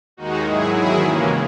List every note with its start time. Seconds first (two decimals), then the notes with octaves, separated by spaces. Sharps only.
0.17 D#2 D#3 G#3 D#4 F#4
0.46 G#2 F#3 E4 G#4
0.75 E2 D#3 F#3 E4 G#4
1.03 D#2 C#3 E3 G#3 A#3 C#4